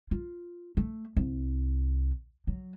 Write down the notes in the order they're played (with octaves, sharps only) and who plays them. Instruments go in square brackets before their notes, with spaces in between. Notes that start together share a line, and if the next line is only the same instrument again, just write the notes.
[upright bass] F4
A3
C2
F#3